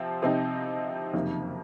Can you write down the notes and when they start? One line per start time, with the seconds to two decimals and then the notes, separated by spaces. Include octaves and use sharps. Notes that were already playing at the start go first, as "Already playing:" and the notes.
Already playing: C3 F3 C4
0.22 C3 F3 C4 D#4
1.14 F#1 F2 C3 D#3 A#3